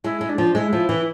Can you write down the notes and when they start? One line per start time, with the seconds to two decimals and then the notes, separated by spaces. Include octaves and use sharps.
0.04 G#3 E4
0.21 G#3
0.29 D4
0.38 F3
0.55 G#3 E4
0.73 F3
0.89 E3